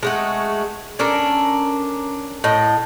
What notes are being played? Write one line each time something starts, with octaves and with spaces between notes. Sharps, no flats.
G#3 A3 F#4
C#4 D4 A4 A#4
A2 D#5 F#5